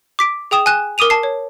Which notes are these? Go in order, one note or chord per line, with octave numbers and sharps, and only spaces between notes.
D6 B6 D7
G#4 G5 D#6 E7
G#5 F#6 E7
A#4 D6 D#6 D#7 F7
A5 C7
C#5